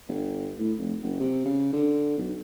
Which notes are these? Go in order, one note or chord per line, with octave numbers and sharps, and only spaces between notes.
G1
A2
F1
F#1
C3
C#3
D3
B1